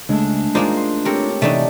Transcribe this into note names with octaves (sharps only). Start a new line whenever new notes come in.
C#2 G#3 A3 D4
G#3 A#3 D#4 F4 C5 D5
C6
C4 G4 A4 A#4 C#5
C3 E3 A3 D4 D#4